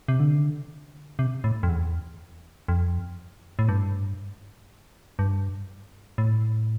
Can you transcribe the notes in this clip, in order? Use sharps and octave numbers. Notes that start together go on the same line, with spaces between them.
C3
D3
C3
A2
F2
E2
F2
A2
G2
G2
A2